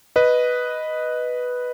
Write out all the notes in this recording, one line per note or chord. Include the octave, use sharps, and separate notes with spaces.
B4 D#5